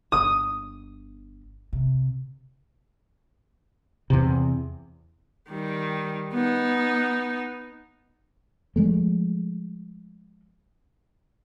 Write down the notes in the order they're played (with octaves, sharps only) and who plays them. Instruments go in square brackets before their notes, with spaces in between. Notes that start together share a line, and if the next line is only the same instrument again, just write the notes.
[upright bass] G1 [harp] D#6
[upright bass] C3
[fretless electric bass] E2 C3
[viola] D#3 G3
B3 D#4
[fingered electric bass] F3 G#3 A3